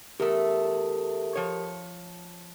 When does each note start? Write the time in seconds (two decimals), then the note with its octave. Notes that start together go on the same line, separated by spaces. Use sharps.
0.20 E2 A3 G4 A#4 D#6
1.35 F3 C#5